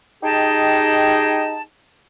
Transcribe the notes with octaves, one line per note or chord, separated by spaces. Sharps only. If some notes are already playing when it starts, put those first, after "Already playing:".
D#4 G4 G#4 D#5 G5 A5